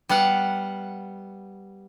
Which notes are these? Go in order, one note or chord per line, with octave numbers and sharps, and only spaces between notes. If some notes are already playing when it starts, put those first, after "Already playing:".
G3 B3 F5 F#5